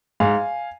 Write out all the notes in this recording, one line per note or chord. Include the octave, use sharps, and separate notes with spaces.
G#2 F5 G#5